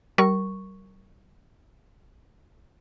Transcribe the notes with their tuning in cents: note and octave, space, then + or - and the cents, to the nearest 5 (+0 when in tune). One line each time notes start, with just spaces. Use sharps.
G3 -40 A#4 +0 C#6 +0